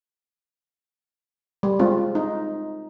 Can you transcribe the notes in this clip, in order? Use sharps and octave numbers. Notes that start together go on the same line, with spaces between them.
G3
G#3 C4 F4
D#4